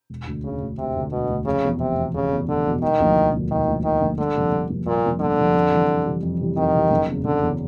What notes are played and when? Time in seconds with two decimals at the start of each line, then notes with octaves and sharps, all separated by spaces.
0.10 E1
0.27 D2 D3
0.44 E1 C#3
0.61 D2 D3
0.78 E1 C3
0.95 D2 D3
1.12 E1 B2
1.29 D2 D3
1.46 F1 C#3
1.63 E2 B2
1.80 F1 C3
1.97 E2 B2
2.15 F1 C#3
2.32 E2 B2
2.49 F1 D3
2.65 E2 B2
2.82 E1 D#3
2.99 D2 D3 F3 A#3
3.16 E1
3.34 D2 D3 F3 A#3
3.50 E1 D#3
3.67 D2 D3 F3 A#3
3.84 E1 D#3
4.01 D2 D3 F3 A#3
4.18 G1 D3
4.35 F2 C3 F3 A#3
4.52 G1
4.69 F2 C3 F3 A#3
4.86 G1 A#2
5.04 F2 C3 F3 A#3
5.21 G1 D3
5.37 F2 C3 F3 A#3
5.55 F2
5.71 C3 E3 G3
5.88 F2
6.06 C3 E3 G3
6.23 F2
6.40 C3 E3 G3
6.57 F2 D#3
6.74 C3 E3 G3
6.90 F#1
7.08 E2 C#3
7.24 F#1 D3
7.42 E2 C#3